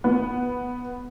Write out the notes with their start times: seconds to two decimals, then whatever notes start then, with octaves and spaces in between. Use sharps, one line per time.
0.04 B3